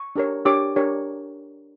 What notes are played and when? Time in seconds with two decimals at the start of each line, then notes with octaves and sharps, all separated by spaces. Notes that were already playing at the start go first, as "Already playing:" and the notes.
Already playing: C#6
0.16 D4 G4 A#4 C#5
0.45 D4 G4 A#4 C#5 D6
0.76 D4 G4 A#4 C#5